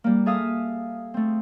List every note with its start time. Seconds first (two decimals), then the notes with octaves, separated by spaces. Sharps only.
0.04 G3 A#3
0.26 G#4 A4 E5 F5 D#6
1.14 A3 C4